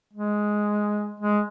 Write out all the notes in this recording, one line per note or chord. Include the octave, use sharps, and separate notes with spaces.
G#3
G#3